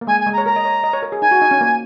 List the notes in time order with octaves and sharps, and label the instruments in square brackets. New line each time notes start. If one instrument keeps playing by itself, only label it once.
[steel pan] A#3
[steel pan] G#3 [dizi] G#5
[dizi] G#5
[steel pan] G#3
[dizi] A#5
[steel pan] C#5
[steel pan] A#4 [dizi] A#5
[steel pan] D#5
C#5
D#5
C#5
A#4
G#4
[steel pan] D#4 [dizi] G#5
[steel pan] F#4
D#4
C#4
A#3